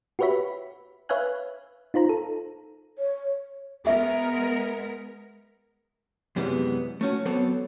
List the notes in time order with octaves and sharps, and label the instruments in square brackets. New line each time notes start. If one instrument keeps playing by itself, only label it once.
[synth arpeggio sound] F#4 G4 B4 C#5 E5 B5
B4 C#5 E5 F5 G#5 F#6
D#4 F4 C5 A#5
A4
[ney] C#5
[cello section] G#3 B3 A#4 [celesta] E5
[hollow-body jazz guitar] F#2 C3 E3 G3 G#3 B3
A3 C#4 F#4
F#3 B3 C4 A4 C#5 D5